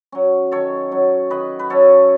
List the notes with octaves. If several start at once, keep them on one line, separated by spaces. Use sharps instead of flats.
F#3 C#4
D#3 A4 C#5
F#3 C#4
D#3 B4 D#5
B4
F#3 C#4 A4 C#5